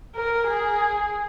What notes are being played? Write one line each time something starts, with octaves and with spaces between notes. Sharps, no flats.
A#4
G#4